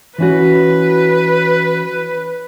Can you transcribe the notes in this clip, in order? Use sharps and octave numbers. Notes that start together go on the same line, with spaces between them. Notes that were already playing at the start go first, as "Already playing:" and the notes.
E3 C#4 F#4 B4